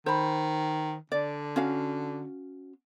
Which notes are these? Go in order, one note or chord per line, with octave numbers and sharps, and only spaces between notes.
D#3 C5 B5
D3 D5
C#4 F#4 F5